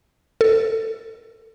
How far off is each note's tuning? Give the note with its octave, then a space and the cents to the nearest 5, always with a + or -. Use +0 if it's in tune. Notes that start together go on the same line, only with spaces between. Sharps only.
A4 +15